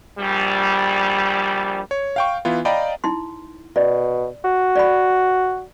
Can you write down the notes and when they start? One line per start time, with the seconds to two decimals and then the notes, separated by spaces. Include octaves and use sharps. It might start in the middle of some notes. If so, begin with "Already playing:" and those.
0.19 A#1 G3
1.91 C#5
2.16 F5 G5 C#6
2.45 E3 B3 E4 F4
2.65 D5 D#5 F5 G5 A#5 B5
3.04 D#4 E4 C6
3.76 B2 D5
4.44 F#4
4.76 D5 B5